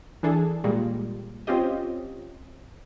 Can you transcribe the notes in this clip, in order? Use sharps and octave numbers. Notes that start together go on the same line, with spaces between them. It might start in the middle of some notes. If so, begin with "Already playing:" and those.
E3 D4 G#4 A4
A#2 G3 G#3
C4 C#4 F4 G4 D#5